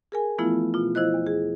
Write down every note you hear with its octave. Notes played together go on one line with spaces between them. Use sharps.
G#4 A#4 G#5
E3 F3 A3 B3 E4 F4
B2 F4
F3 E4 C5 D#5 F#6
E2
G#4